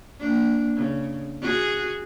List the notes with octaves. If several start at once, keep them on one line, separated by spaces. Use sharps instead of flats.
A#3 D4
C#3
F#4 G#4